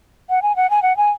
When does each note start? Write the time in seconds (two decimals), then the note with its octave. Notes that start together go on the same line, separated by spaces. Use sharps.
0.30 F#5
0.42 G#5
0.56 F#5
0.70 G#5
0.82 F#5
0.97 G#5